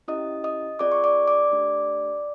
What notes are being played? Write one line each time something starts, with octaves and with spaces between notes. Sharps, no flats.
C#4 E4 G4 D#5 D#6
D#5 D#6
C4 F4 G#4 D5 D6
C#6
D5 D6
D5 D6
A3 D4 G4